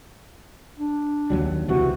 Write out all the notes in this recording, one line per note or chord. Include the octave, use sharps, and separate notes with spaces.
D4
D#2 F#3 G3
C#2 C3 E3 F#4